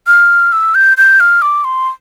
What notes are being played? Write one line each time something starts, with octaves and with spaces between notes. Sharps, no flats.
F6
E6
G6
G6
F6
D6
C6